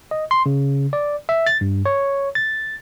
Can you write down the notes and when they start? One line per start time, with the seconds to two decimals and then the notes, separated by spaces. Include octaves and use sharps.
0.11 D#5
0.31 C6
0.46 C#3
0.93 D5
1.29 E5
1.47 A6
1.61 G2
1.86 C#5
2.35 A6